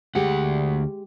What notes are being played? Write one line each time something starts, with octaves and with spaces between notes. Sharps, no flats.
D2 G#3 G4 F#5